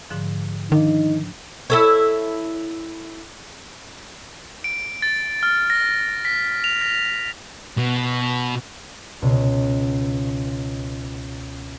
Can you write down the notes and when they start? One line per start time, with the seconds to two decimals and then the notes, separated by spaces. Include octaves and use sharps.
0.10 G#2 D3 F3
0.72 D#3 F3 D4 D#4
1.70 E4 A4 C#5
4.64 D7
5.02 A6
5.43 F6
5.70 A#6
6.25 B6
6.64 F7
6.82 A#6
7.78 B2
9.22 C#2 B2